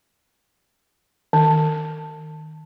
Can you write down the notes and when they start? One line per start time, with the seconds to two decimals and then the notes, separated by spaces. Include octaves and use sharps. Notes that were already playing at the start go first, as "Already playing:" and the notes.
1.33 D#3